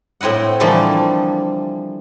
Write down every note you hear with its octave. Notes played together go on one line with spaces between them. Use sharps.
A2 C4 E4 D#5 F#5
D3 E3 F3 G3 A3 A#3